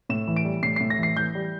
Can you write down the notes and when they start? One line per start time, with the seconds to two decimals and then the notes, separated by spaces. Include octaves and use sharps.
0.09 A2 E7
0.28 E3
0.36 D7
0.45 G3
0.63 A2 C7
0.76 A2 C7
0.90 A#6
0.98 E3 C7
1.16 E3 G6
1.35 G3